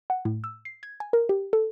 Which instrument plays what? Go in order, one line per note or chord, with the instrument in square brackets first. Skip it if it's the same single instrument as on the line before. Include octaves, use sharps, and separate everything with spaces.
[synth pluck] F#5
A2
E6
C7
G#6
G#5
A#4
G4
A4